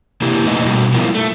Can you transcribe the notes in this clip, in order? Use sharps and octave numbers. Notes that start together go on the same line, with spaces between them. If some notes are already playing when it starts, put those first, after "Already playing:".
C3 A#3 E4 G4
A#2 A3 D#4 B4 D#5
B2 G3 F#4
F3 G3 B3 E4 F4 A#4
A3